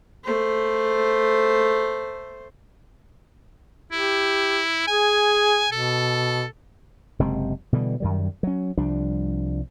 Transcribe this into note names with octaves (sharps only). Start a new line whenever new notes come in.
A3 C5
E4 G4
G#4 G#5
B2 A4
F#1 C3 G#3 C4
B2 D3 E3 G3
F#2 D#3 G3
F#3 C#4
C2 F3 G3 D4